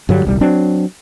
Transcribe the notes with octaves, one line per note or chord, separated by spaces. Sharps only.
G2 D3 F#3 G3
D#1 C2 G3
F#3 C4 D4